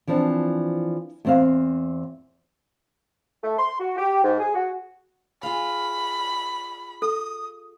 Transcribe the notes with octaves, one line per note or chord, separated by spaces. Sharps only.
E3 F3 C4 D4
E2 C4 F5
A3
C6
F#4
G4
G#2
G#4
F#4
F4 G#4 F5 B5
A4 D#6